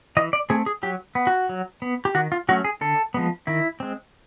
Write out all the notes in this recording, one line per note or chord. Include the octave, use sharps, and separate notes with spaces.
E3 D#5
D5
A3 C4 G#4
G#4
F#3 G4
B3
F#4
F#3
B3
G4
D#3 F#4
F4
F#3 A3 C#4 F#4
G#4
D3 A4
F3 G#3 B3
D#3 E4
G#3 C4